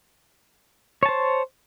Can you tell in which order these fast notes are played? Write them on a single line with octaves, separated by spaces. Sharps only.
C#5 A5 C5